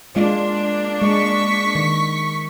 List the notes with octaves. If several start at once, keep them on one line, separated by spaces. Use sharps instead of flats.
G#3 A#3 D4 F4
G#3 C#6 B6
D#3